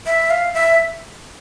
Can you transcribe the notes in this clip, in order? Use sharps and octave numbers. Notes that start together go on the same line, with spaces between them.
E5
F5
E5